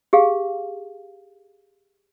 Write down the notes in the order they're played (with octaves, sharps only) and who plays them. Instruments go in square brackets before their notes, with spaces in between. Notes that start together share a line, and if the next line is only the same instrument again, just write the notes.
[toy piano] G4 G#4 F5